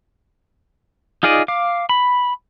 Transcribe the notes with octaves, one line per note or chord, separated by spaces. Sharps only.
D#4 F4 G#4 D5 D#5
F5 D6
B5